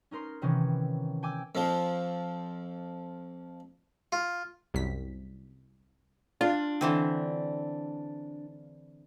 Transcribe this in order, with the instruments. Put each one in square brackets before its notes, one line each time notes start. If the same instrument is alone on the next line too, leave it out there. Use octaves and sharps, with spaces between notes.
[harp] C#4 D#4 A#4 C6
C3 D#3 E3 B3 C#4
G5 G#5 D6 E6
[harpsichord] F2 F3
F4
[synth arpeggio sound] C2 F#2 B6
[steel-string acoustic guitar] D4 [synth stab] F4
[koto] D3 E3 C4